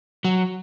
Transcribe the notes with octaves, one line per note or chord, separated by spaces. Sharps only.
F#3